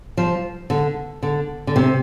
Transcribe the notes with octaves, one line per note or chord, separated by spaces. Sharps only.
F3
D3
D3
D3
C3